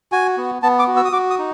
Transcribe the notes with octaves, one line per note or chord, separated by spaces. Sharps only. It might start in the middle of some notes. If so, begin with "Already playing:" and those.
F#4 G#5
B3
B3 A5
D6
F#4
E6
D#6
F#4 D6
D#6
D#4